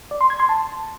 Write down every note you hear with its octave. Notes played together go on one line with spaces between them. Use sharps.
D5
C6
G#6
C6
A5